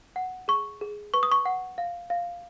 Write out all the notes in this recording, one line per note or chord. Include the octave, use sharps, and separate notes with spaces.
F#5
G#4 C#6
G#4
B4 C#6
D#6
C#6
F#5
F5
F5